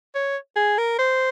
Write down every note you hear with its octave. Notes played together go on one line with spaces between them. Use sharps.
C#5
G#4
A#4
C5